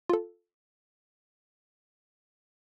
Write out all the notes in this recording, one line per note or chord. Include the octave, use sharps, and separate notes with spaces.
F4 A4